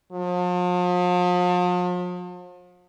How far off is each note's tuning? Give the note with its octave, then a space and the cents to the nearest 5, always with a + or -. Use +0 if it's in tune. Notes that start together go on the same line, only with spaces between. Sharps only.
F3 +40